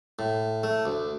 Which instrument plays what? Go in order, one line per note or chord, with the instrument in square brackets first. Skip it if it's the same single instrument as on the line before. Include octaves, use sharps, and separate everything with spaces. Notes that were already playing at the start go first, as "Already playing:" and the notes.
[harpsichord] A2
A3
D2